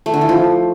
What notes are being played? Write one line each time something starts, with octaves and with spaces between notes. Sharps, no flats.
A3
D3
E3
F3